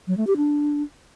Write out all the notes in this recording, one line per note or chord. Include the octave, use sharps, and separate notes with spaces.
F#3
A3
G4
D4